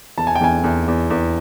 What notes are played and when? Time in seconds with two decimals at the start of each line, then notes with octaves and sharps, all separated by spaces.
0.18 E2 A5
0.27 G#5
0.35 G5
0.41 E2 G#5
0.64 E2
0.88 E2
1.10 E2